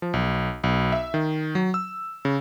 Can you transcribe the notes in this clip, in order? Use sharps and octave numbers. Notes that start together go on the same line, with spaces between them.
F3
B1
B1
E5
D#3
F#3
E6
C#3